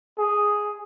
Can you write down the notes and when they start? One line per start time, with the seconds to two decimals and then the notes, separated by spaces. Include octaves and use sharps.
0.18 G#4